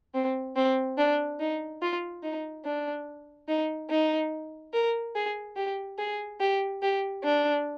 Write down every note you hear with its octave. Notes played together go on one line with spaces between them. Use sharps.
C4
C4
D4
D#4
F4
D#4
D4
D#4
D#4
A#4
G#4
G4
G#4
G4
G4
D4